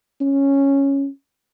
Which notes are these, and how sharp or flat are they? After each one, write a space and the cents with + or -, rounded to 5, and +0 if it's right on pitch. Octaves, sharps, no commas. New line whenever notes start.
C#4 -5